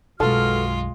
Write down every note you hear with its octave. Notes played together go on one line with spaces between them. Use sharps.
B1 F#2 G#3 B3 F4 F#4 A4 F6